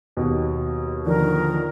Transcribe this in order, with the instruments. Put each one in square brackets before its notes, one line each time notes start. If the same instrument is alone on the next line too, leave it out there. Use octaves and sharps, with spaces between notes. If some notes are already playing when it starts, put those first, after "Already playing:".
[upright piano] D#2 B2
[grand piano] D3 D#3 F3 [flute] A#4